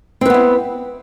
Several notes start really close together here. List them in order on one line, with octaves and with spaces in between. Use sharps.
C4 B4 B3 E4